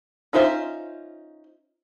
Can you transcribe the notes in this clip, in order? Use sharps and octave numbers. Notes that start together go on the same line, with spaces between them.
C#4 D#4 F4 C5 E5